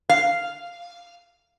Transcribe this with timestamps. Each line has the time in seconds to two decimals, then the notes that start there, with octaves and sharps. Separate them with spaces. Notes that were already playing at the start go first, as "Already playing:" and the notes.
0.09 F5